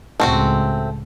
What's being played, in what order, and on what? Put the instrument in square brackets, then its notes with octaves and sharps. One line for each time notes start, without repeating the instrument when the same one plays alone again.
[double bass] C#2 A2 [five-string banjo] A3 C4 F#4